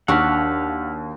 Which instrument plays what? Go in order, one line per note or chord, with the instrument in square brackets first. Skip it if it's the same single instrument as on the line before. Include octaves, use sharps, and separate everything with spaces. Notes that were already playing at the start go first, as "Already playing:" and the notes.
[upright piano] D#2 [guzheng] D4 F#4 [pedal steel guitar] F5 F#5 [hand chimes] E6 F6 B6